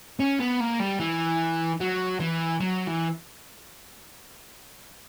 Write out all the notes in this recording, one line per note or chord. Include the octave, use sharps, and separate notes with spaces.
C#4
B3
A#3
G3
E3
F#3
E3
F#3
E3